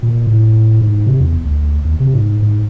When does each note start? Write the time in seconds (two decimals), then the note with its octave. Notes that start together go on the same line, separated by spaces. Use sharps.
0.03 A#2
0.27 A2
0.81 G#2
1.06 C3
1.20 E2
1.45 D2
1.85 D#2
2.00 C3
2.14 G#2
2.42 G#2